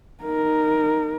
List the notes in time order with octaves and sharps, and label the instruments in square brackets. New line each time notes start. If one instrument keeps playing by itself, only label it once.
[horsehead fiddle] D#4 A#4